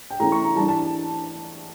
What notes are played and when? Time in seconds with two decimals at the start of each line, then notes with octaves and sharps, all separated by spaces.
0.10 G5
0.20 E3 A3 C#4 E4 A#5
0.32 C#6
0.44 A#5
0.56 E3 G3 D4 A5
0.68 A5